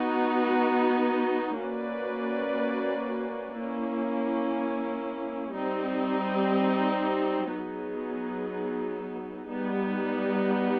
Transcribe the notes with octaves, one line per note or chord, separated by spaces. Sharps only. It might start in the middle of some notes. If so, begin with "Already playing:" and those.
Already playing: B3 D#4 F#4
A#3 C#4 F#4 B4 D5
A#3 C#4 E4
G3 C4 D#4
F#3 B3 D#4 G#4
G3 B3 D#4